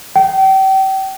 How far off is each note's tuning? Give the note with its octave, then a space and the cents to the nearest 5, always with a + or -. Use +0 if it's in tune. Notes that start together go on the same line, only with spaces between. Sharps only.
G5 -35